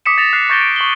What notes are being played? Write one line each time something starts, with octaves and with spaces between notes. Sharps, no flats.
D6 D#6 B6 C#7 E7
A6 A#6 E7 F7
F#6 C7
C#6 G6 A6 A#6 D7 G7
D7
C#6 F#7 G7